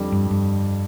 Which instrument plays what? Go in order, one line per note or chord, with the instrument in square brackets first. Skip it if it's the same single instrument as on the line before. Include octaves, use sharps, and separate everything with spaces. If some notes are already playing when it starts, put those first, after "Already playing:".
Already playing: [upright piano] F2 D3 G3 D4
[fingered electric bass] G2
G2